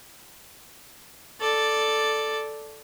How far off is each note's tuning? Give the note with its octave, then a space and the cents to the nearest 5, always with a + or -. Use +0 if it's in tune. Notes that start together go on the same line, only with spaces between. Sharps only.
A4 +0 D5 +0